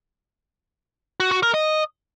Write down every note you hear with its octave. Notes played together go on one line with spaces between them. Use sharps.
F#4
F#4
A#4
D#5